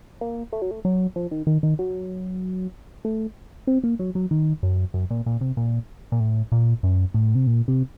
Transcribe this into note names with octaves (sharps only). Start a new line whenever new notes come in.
A#3
A3
F#3
A3
F#3
F3
D#3
D#3
D#3
F#3
A3
C4
A#3
F#3
F#3
D#3
F#2
F#2
A#2
A#2
C3
A#2
A#2
A2
A#2
F#2
A2
C3
A#2
C3